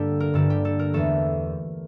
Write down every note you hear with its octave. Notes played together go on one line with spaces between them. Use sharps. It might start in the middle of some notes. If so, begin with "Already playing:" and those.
Already playing: G2 D3 G3 A#3 G4 A4
A#4
G2 D3 G3 A#3 A4
G4
A4
A#4
E2 E3 A3 A4